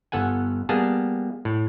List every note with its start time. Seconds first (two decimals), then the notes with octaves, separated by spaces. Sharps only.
0.12 G1 B3 A4 F#5 G#5
0.69 G3 A#3 B3 G#4 A5
1.45 A2